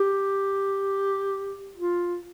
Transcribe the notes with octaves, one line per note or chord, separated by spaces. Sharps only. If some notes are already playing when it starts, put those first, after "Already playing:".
Already playing: G4
F4